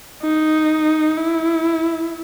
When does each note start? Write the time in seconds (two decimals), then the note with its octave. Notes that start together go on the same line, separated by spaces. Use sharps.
0.23 D#4
1.17 E4